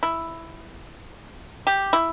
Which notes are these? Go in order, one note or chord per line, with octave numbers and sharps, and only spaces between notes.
E4
G4
E4